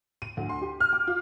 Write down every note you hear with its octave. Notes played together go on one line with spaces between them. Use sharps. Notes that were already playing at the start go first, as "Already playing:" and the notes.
D#7
D2
C6
G4
F6
D6
F4